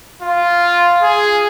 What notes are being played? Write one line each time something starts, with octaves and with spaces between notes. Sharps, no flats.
F4
G#4